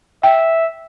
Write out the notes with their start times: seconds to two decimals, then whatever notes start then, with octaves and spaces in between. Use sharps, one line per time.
0.23 E5 G5